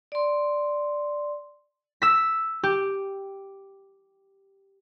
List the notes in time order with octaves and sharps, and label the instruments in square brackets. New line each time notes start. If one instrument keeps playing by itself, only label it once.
[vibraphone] D5 C6
[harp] E6 B6
G4